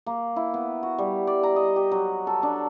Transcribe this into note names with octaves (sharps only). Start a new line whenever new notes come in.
A#3
E4
B3
F#4
G3
D5
A#5
D#5
G4
F#3
A4
D4